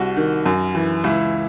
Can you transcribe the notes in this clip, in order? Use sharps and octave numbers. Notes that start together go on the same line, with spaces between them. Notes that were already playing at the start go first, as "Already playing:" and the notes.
Already playing: C2 F#4
D#3
F#2
E3
C#2 E4